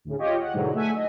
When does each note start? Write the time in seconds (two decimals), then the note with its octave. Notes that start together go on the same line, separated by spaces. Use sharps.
0.05 D2 A2 C#3
0.18 F4 G4 C#5 D#5
0.41 F#5
0.53 G#2 B2 D3 E3 F#3
0.74 A3 E5 F#5 G#5
0.95 D#5